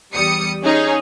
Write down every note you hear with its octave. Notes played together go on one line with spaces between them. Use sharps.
E2 G3 D#6 C#7
C#4 D#4 G#4 C#5